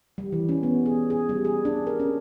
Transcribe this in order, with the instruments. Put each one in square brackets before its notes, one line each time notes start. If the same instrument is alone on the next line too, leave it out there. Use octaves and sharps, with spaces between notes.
[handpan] G3
E3
C#4
B3
G#4
G#4
G3
G#4
D4
A#4
C#4